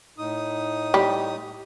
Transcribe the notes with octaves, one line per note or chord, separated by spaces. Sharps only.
A2 D#4 D#6
G3